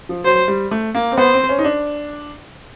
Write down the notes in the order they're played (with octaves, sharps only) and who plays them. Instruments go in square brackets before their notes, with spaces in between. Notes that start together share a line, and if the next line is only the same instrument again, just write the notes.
[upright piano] F3
[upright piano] F#3 [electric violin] C5
[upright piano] G3
A3
A#3
C4
[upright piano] B3 [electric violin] C5
[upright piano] C4
C#4
D#4
D4